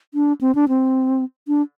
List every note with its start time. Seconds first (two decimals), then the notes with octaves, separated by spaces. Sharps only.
0.14 D4
0.41 C4
0.55 D4
0.69 C4
1.48 D4